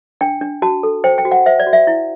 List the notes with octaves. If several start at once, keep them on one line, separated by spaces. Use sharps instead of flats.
D4 G5
D4
F#4 A5
A4
C5 G5
G5
F#4
F#5
C5 E5
D5
F#4
E5
E4